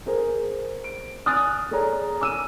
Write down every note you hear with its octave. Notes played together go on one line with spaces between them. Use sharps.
G#4 A#4 C5
D7
G#5 D#6 F6 F#6 A6
G#4 A4 C#5 D5 A#5
G#5 D6 E6 D#7